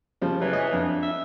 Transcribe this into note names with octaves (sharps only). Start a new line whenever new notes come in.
C#3 F3 G3
E3 F#3
C#5 D#5 G#5
F2 D4
E5